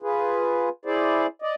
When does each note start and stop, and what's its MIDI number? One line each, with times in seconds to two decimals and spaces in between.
0.02 0.69 65
0.02 0.69 68
0.02 0.69 71
0.85 1.27 64
0.85 1.27 68
0.85 1.27 72
0.85 1.27 74
1.42 1.55 74
1.42 1.55 75